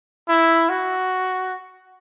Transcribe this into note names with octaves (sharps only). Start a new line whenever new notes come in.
E4
F#4